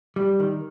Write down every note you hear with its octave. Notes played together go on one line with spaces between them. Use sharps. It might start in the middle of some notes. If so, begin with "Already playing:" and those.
G3
D#3